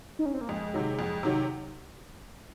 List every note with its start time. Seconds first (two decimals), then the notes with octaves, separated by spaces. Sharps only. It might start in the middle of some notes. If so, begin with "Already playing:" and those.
0.19 D#4
0.26 C#4
0.34 C4
0.41 A#3
0.49 F2 G#3
0.74 C3 D#3 F#3
0.99 F2
1.23 C3 D#3 F#3